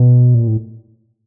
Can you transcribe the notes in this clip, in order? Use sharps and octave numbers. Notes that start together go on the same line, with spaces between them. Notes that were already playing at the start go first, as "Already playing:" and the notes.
Already playing: B2
A#2
A2